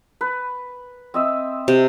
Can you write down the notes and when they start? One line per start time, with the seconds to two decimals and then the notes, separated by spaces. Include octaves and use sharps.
0.21 B4
1.14 C4 D#5 E5
1.68 C3